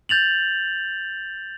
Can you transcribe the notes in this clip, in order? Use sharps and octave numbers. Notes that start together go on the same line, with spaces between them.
G6 A6 F7 F#7